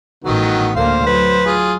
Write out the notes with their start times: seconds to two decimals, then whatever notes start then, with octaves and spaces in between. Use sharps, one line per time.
0.25 A1 D#3 F#3 B3
0.76 D2 A#3 C5 F5
1.06 F#3 B4
1.45 F4 G#4